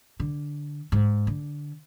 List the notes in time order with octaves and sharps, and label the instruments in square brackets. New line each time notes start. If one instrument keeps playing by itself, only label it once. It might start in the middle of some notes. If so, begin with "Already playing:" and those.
[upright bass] D3
G#2
D3